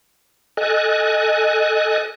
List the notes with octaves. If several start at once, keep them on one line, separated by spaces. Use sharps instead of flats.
A4 D#5 G#5 F#6